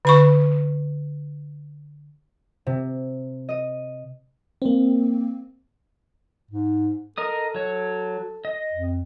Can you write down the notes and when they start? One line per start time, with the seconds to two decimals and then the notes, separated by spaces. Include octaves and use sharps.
0.05 D3 B5 C#6
2.67 C3
3.49 D#5 D#7
4.62 A#3 C4
6.51 G#2
7.18 A4 A#4 D#5 D#6
7.55 F#3 C#5
8.45 D#5
8.73 F2